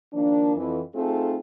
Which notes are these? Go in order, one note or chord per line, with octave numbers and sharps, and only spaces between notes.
D#3 F3 A#3 D4
F2 E3
A3 C4 D#4 F4 G#4 A4